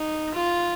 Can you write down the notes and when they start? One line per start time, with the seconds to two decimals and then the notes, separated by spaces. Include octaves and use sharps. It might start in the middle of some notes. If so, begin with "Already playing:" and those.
Already playing: D#4
0.34 F4